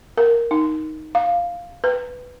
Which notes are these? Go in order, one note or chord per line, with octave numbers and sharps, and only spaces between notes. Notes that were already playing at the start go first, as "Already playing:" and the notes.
A#4
D#4
F5
B4